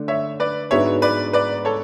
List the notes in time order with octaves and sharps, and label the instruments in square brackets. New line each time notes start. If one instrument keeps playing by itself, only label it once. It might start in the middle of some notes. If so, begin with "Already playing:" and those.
Already playing: [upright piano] D3 A3 D4
[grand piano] C#5 E5
B4 D5
[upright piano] G#2 G#3 B3 D4 F#4 [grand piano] C#5 E5
[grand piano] B4 D5
B4 D5
A4 C#5